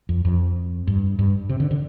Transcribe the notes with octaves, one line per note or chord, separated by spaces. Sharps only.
F2
F2
G2
G2
C3
D3
D3